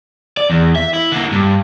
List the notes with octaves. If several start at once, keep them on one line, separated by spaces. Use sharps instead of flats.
D5
E2
E5
E4
D3 A#3
G2